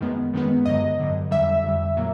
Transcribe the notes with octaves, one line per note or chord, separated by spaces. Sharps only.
F#2 D#3 G#3 B3
F#2 D#3 G#3 B3
G2 D3 F#3 D#5
G2 D3 F#3
F2 D3 G3 E5
F2 D3 G3
A#2 F#3 A#3